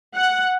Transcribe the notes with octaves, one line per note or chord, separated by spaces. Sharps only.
F#5